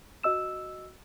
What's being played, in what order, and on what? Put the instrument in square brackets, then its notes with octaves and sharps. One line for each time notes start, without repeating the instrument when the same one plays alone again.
[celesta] F#4 D#5 E6 E7